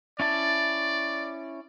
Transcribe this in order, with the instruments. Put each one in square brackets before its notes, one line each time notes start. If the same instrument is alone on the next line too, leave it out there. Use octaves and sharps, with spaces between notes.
[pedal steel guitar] C#4 E4 A5 [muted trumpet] D5